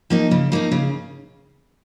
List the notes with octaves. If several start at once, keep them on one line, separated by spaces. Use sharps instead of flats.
F3 A#3 D#4
C#3
F3 A#3 D#4
C#3